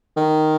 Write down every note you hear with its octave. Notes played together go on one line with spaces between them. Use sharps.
D#3